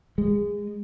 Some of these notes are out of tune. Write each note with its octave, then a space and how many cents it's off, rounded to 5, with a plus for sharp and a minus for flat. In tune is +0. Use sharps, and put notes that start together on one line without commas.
G#3 -25